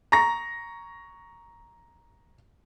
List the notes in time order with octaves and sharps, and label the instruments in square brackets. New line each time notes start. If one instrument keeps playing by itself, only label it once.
[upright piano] A#5 C#6 A#6